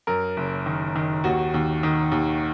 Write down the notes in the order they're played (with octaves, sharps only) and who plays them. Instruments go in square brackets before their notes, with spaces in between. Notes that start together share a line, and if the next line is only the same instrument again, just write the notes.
[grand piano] F#2 A#4
F#1
D#3
D#3
D#2 F#4
D#2
D#3
D#2